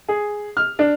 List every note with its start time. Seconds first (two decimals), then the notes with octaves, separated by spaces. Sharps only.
0.08 G#4
0.57 F6
0.79 D4